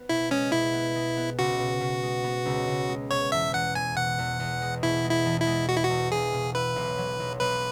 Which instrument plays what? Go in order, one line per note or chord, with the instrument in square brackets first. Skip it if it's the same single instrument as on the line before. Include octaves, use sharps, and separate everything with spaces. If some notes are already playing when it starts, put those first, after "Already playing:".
Already playing: [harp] B3
[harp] B2 [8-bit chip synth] E4
[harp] G#3 [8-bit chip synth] C#4
[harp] B2 [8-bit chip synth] E4
[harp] B3
G#3
B3
[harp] C#2 [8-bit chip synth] F#4
[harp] B2
B2
G#3
B3
C#2
C#2
G#3
[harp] B2 [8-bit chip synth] C#5
[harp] E2 [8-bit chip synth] E5
[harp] E2 [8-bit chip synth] F#5
[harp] E2 [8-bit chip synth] G#5
[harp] B2 [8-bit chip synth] F#5
[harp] E2
E2
G#3
[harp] B2 [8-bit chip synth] E4
[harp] G#3
[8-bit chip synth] E4
[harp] E2
[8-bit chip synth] E4
[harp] G#3
[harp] G#3 [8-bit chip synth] F#4
[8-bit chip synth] E4
F#4
[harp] E2
[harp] E1 [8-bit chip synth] G#4
[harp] B2
[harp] E4 [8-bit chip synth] B4
[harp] B1
F#3
B1
[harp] B1 [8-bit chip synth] B4